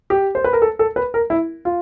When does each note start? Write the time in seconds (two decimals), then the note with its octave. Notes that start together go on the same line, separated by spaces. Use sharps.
0.10 G4
0.35 C5
0.44 B4
0.53 A#4
0.62 A4
0.79 A4
0.96 B4
1.14 A#4
1.30 E4
1.65 F4